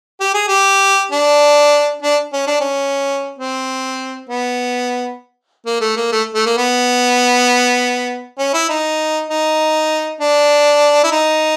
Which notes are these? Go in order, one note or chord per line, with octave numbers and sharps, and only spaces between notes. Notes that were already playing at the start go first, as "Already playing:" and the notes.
G4
G#4
G4
D4
D4
C#4
D4
C#4
C4
B3
A#3
A3
A#3
A3
A3
A#3
B3
C#4
E4
D#4
D#4
D4
E4
D#4